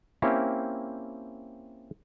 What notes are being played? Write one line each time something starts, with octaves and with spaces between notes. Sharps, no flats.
A#3 C4 C#4 E4 G4